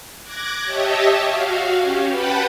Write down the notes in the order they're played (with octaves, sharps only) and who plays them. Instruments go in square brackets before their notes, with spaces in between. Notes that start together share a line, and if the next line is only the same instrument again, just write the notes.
[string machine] D6 F#6 G#6 A#6
G4 C#5 D#5 E5 A5
F#4 F5
C#4 G4
B4 F#5 G5 A5 B5